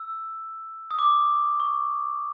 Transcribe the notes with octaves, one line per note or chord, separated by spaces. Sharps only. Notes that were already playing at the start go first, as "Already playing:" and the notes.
Already playing: E6
D#6
D6
C#6